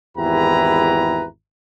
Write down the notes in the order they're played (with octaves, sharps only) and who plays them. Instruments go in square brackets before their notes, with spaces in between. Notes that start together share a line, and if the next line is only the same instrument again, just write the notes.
[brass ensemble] G#1 E2 E4 G4 B4 A#5